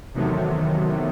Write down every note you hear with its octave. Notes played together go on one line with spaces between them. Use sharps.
E2 C3 D#3 F#3 A3